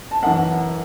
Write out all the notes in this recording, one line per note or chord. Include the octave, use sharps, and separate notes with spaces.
A5
F#2 E3 F#5